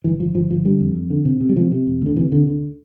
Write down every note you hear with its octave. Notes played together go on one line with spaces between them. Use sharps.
G1 E3
G1 F3
G1 F3
G1 F3
D3 G3
F2
F2
D3
C3
C3
G3
C3 F3
C3
E1
D2 D3
C3 E3
D2 D3
D3